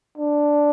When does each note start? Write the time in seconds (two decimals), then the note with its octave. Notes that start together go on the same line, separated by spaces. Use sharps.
0.17 D4